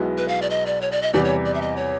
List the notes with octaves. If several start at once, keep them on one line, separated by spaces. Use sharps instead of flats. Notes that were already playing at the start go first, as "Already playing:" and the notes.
Already playing: B1 B2 G#3 B3 E4
B4
F5
D5
D#5
D5
C#5
D5
D#5
E2 C3 E3 G3 D5
C#5
D5
E5
D#5
C#5